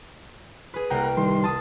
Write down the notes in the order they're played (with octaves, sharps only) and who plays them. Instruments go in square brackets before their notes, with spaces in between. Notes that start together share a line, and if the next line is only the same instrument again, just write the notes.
[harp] G#4 B4
[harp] C2 A#3 G5 [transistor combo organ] F#5 A#5
[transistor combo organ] D#3 G3 C6
[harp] A5 D#6